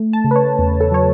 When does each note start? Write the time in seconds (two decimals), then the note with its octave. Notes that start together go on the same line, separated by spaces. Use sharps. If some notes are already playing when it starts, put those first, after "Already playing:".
Already playing: A3
0.13 A5
0.24 C#3
0.31 B4
0.36 C#5
0.59 E2
0.81 A4
0.92 F#3 C#5